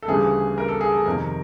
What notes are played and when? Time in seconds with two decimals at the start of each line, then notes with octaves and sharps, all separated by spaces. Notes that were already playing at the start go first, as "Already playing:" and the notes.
0.03 A4
0.08 D2 C#3 E3 G3 G#4
0.58 A#4
0.68 A4
0.81 G#4
0.92 A4
1.06 F2 C3 D#3 A#4